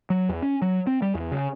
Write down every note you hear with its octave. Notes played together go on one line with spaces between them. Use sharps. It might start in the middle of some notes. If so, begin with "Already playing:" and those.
F#3
E2
C#4
F#3
C4
G3
E2
C#3